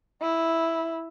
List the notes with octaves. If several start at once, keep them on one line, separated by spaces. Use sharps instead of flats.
E4